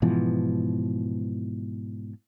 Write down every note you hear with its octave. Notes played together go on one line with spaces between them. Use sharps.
G#2 B2 E3 F3